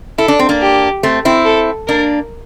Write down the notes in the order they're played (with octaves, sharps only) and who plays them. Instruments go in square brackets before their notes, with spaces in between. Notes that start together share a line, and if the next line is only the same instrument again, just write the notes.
[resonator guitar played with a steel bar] E4 [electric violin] A4
[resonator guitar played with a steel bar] D4
C4
A#3 D4
[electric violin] G4
[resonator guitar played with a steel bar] A3 C4
C4 E4
[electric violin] A4
[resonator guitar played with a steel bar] A#3 D4 [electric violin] A#4